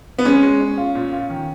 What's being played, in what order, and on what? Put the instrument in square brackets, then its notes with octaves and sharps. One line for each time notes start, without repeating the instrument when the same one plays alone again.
[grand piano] B3
[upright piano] G#3 [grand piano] C#4
[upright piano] G#3
C#4
F4
A#2
F4
D#3